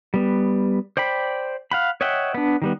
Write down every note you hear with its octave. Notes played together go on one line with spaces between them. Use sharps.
G3 B3
C5 D5 G5 B5
F5 F#5 B5
C#5 D#5 E5 F#5 G5
B3 D4
D#3 G3 B3